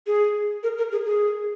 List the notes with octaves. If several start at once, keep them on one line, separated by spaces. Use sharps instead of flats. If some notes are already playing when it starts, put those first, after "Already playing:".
G#4
A#4
A#4
G#4
G#4